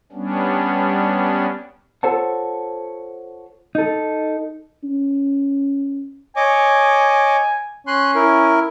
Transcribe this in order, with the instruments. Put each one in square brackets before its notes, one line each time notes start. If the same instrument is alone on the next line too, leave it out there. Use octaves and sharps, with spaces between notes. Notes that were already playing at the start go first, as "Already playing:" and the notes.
[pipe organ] G3 B3 C#4 D4
[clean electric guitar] F4 A4 C5 C#5 F#5 A5
D#4 A4
[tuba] C#4
[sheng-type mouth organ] C#5 D#5 D6 [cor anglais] G#5
[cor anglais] C#4 [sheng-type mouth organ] C6 F#6
[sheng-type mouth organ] E4 A#4